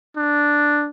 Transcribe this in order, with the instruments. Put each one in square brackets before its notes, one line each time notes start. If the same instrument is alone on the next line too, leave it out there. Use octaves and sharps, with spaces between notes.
[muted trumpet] D4